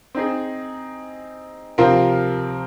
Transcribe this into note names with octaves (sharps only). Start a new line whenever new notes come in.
C4 D#4 G#4
C3 F3 C4 F4 A#4